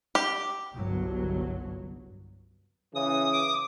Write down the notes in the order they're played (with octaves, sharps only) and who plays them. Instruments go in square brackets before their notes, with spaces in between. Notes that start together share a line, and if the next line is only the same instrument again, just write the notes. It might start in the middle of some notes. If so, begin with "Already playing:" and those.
[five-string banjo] G4
[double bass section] G1 C2 G2 F#3
[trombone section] C#3 E3 [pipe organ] D#6
[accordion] D6